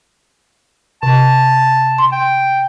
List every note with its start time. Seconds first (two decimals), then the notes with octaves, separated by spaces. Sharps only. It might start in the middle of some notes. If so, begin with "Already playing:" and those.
1.03 C3 A5
1.98 C6
2.12 G5